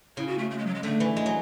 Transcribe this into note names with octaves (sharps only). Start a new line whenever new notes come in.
C#3 E4
F#4
A3
A3
G#3
F#3
G#3
D3 A3
E3
G#3
F#3